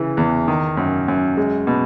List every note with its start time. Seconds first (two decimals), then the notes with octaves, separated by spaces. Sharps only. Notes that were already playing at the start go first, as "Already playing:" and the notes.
Already playing: C#3 E3
0.17 E2
0.48 D#3
0.77 F#2
1.08 F#2
1.37 G#3
1.67 B2